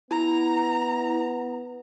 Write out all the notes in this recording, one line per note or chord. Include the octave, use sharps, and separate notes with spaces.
B3 E4 A#5